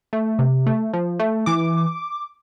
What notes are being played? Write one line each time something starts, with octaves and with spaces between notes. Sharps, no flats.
A3
C3
A3
F3
A3
E3 D6